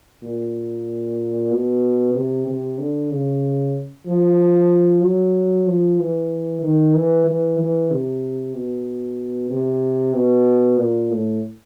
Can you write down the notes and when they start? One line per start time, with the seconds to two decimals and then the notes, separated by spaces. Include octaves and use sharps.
0.23 A#2
1.51 B2
2.15 C3
2.47 C3
2.79 D3
3.11 C#3
4.07 F3
5.03 F#3
5.67 F3
5.99 E3
6.63 D#3
6.94 E3
7.26 E3
7.59 E3
7.91 C3
8.54 B2
9.50 C3
10.14 B2
10.79 A#2
11.10 A2